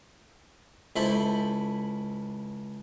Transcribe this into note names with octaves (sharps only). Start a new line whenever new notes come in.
C#2 E4 A4 C5 B5